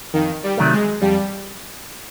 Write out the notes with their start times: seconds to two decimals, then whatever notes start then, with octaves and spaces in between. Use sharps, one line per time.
0.13 F2 D#3
0.43 G3
0.57 C3 D#3 F#3 A3
0.72 G#3
1.01 F2 G3